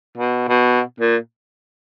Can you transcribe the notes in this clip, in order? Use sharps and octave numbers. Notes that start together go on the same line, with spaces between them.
B2
B2
A#2